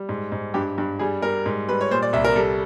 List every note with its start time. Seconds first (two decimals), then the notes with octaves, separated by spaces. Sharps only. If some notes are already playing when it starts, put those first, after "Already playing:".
Already playing: G3
0.09 G#2
0.32 G#2
0.54 G2 G4
0.78 G2
0.99 G3 G#4
1.22 G3 A#4
1.46 G#2
1.68 G3 B4
1.81 C#5
1.91 A#2 C5
2.02 D5
2.13 C2 E5
2.25 A#4
2.36 G3 A4